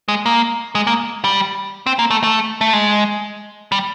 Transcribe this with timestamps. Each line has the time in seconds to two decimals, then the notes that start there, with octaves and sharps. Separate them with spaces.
0.08 G#3
0.26 A#3
0.75 G#3
0.87 A#3
1.24 G3
1.86 C4
1.99 A#3
2.10 A3
2.23 A3
2.61 A3
2.73 G#3
3.72 G3